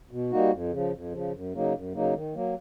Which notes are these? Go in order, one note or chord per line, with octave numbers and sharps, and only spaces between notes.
B2
G3 A#3 D#4 F#4
F2
C#3 F3
F2
C#3 F3
F#2
C#3 F#3 A#3 D#4
F#2
C#3 F#3 A#3 D#4
D#3
F#3 A#3